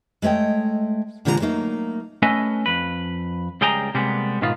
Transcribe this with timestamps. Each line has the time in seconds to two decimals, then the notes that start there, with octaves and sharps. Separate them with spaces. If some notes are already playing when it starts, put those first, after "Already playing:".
0.22 G#3 A3 C#5 D#5 G5
1.25 A#2 D3 F3 G#3 A#4 A#5
1.40 F#3 A3 A#3 D#4
2.22 A3 C#4 A4 B4 D#5 G#5
2.66 F2 B4
3.61 C#2 G3 G#4 G5 G#5 A#5
3.94 C3 G3 G#3 A#3 B3
4.41 G#2 B2 D#3 B3 F4